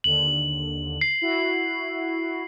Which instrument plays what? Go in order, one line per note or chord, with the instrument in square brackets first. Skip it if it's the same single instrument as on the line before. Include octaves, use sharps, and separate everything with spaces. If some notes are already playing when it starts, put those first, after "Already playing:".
[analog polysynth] D#2 D3 [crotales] F#7
[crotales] C7
[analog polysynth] E4 F#4